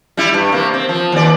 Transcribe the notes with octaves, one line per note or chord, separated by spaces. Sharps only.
G3 E4
G2
C3 A#3
C4
F3
D#2 D5